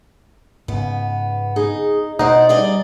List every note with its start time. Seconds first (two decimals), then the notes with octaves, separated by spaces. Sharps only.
0.68 G#2 C#3 B3
1.56 D#4 G#4
2.19 B2 D#4 E4 C5 D5 F#5
2.49 G3 G#4 D5 D#5